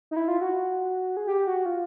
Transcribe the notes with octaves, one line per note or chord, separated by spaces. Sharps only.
D#4
E4
F4
F#4
G#4
G4
F#4
F4